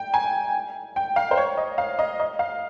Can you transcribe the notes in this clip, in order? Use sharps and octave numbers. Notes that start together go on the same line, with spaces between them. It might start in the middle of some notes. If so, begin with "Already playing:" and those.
Already playing: G5
G#5
G5
F5
C5
C#5
D#5
F5
D#5
D#5
F5